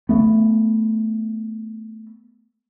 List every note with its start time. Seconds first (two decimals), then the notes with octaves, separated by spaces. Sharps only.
0.09 A3 B3